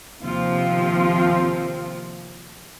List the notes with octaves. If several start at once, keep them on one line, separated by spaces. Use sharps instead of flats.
D#2 C3 F3 C4 F4